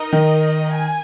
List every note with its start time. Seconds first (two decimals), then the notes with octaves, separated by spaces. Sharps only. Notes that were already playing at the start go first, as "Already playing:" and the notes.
Already playing: D#4 A#4 D#5
0.13 D#3
0.73 G#5